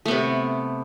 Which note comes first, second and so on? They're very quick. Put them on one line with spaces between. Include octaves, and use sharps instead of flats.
A3 B3 C3